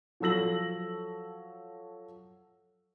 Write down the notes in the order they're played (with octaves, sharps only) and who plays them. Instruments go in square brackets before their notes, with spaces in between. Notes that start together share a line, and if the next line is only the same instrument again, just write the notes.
[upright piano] F3 F#3 A4 E6 A#6 F#7